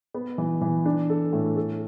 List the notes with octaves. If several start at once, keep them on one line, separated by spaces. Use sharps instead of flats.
B3
E3
E3
D4
A4
A2
A4